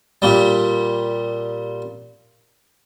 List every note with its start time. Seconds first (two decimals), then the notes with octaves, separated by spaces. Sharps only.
0.22 A#2 G3